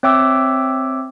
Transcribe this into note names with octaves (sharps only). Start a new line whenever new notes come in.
C4 C#5 E5 G5 D6 E6